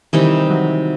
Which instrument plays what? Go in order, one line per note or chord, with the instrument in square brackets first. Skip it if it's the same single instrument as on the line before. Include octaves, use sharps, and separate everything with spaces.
[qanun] C3 D#3 G3 D#4 [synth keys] E3
[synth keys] F#3